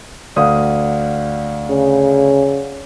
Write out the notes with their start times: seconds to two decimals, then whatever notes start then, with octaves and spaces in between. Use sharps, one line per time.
0.36 D2 D5 F5 F#5 D#6
1.70 C#3